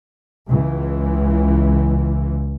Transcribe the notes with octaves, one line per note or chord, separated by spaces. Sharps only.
C#2 E3